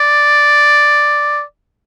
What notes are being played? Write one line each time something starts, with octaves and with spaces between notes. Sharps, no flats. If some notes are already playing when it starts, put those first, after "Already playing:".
Already playing: D5